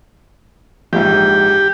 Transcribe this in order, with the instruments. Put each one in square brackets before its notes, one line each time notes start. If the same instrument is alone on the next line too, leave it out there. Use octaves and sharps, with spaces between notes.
[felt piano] A#1 G#2 [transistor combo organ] G4